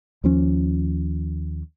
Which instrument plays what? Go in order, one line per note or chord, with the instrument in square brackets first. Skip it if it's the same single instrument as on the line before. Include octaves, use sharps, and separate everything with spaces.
[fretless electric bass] D#2 F3 C#4